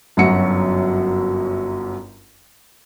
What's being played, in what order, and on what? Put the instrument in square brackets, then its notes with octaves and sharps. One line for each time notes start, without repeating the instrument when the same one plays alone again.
[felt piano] G1 F#2 F#3 C#4 F#4 C#7